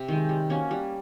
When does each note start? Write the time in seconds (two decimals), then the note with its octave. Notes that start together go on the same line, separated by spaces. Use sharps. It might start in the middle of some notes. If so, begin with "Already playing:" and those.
Already playing: C3
0.08 D#3 G#3
0.29 G3
0.50 A#3 C#4 F#4
0.71 G3